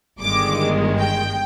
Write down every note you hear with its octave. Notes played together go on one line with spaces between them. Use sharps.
G1 G2 D#3 G#3 D6
G5